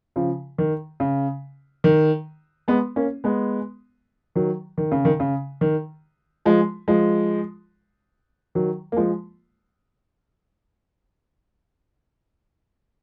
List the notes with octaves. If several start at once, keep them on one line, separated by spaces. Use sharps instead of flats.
C#3 F3
D#3
C#3
D#3
G#3 B3
A#3 C#4
G#3 B3
D#3 F#3
D#3
C#3
D#3
C#3
D#3
F3 G#3
F3 G#3
D#3 F#3
A#3
F3 G#3